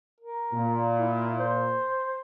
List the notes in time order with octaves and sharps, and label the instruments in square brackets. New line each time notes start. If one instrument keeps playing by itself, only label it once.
[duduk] A#4
[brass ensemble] A#2
[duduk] E4
C5